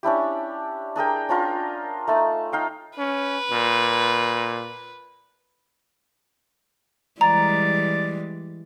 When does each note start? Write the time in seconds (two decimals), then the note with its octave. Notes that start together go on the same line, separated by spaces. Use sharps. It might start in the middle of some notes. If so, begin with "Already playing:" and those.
0.03 C#4 D4 E4 G4
0.96 D4 G#4 A#4 G5
1.29 C#4 D4 F4 A#4
2.07 A3 D#4 A5
2.52 D#4 F5 G5
2.99 C#4 B4
3.51 A#2
7.21 E3 G3 G#3 D5 A#5